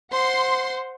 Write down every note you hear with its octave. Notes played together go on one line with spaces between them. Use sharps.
C5 F#5 C6